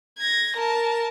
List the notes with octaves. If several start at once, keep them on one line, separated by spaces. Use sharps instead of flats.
G#6 A#6
A#4 A5